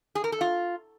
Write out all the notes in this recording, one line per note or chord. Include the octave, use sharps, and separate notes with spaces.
G#4
A#4
A4
F4